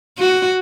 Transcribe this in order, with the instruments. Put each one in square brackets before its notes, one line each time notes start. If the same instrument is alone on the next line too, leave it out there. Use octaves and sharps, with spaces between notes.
[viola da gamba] F#4